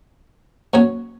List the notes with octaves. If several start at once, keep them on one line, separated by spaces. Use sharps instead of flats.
A#2 F#3 C#4 F#4 C#5